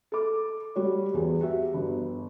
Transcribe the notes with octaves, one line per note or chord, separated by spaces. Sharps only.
A4 D6
G3 F#4 C#5
E2 G#4 C5
F#4 G4 E5
G1